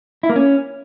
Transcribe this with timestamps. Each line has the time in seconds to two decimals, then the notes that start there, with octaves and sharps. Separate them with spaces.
0.23 E4
0.30 A#3
0.36 C#4